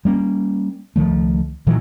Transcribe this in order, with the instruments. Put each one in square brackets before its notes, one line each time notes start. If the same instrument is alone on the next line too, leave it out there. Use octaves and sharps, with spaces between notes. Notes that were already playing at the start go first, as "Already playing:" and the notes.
[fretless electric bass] G3 A#3 C#4
C#2 D#3 F3 A3
A#2 D#3 E3 F#3